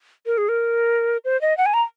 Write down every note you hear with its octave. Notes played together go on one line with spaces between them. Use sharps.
A#4
G#4
A#4
C5
D#5
F#5
G#5
A#5